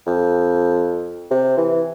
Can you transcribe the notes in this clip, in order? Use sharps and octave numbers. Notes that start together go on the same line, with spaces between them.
F2
C3
E3